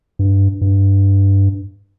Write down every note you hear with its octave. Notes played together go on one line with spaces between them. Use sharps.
G2
G2